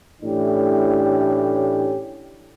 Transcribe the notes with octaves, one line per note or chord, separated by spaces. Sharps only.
A2 E3 A3 C#4 D4 G4